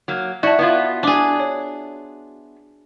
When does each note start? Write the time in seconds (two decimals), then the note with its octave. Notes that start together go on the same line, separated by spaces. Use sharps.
0.08 F#3 A#3
0.43 E4 F#4 D5 A5
0.59 B3 E4 F4
1.03 D4 G#4 D5 D6
1.40 C#5